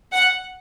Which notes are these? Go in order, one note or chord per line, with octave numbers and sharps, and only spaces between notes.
F#5